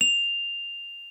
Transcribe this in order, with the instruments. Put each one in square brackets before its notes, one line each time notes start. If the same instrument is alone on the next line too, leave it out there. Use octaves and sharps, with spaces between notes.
[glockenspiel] F7